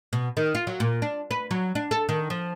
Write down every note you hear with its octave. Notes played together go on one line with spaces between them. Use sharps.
B2
D#3
F4
F#3
A#2
D4
B4
F#3
D4
A4
D#3
F3